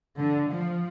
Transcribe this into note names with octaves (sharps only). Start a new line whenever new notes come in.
D3
F3